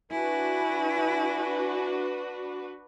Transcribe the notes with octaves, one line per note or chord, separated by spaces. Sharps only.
D4 E4 F#4 B4 G#5